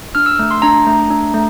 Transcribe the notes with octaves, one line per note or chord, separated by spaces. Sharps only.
D4 F6
E6
A3
C6
D4 A#5
A3
D4
A3